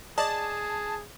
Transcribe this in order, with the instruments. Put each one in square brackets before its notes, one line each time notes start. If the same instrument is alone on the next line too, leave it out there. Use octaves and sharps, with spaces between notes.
[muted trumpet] G#4 [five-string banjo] D5 D#5 [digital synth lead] A5